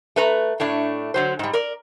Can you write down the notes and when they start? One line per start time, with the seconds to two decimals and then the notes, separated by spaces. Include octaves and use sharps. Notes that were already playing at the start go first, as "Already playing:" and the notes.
0.16 A3 B4 A#5
0.60 A2 A3 D4
1.14 D3 F#3 C5
1.39 G#2 G3
1.53 A#4 D5